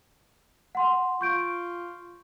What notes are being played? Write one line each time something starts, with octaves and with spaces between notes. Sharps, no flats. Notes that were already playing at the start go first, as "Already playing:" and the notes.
F#5 C6
F4 C#6 G6 D7